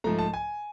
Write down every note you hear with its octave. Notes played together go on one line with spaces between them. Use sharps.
G#2 F3 A3 A#5
A5
G#5